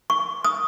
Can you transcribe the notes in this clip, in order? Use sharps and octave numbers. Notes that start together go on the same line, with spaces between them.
C#6
D#6